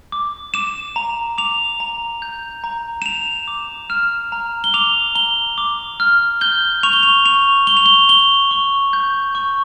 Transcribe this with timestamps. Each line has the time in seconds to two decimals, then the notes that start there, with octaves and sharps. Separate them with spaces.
0.12 D6
0.54 D6 E7
0.96 A#5
1.38 D6 F7
1.80 A#5
2.22 G6
2.64 A#5
3.02 E7
3.05 A#5 F7
3.48 D6
3.90 F6 E7
4.32 A#5
4.64 G7
4.74 D6 F7
5.15 A#5 G7
5.58 D6
6.00 F6
6.41 G6 G7
6.83 C#6 F7
6.93 G7
7.03 F7
7.25 C#6 F7
7.67 C#6 G7
7.77 F7
7.86 G7
8.09 C#6 G7
8.51 C#6
8.93 G6
9.35 C#6